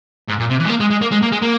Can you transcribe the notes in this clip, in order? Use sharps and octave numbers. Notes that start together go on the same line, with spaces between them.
G#2
A#2
C3
E3
G#3
A#3
G#3
G#3
A#3
G#3
A#3
G#3
A#3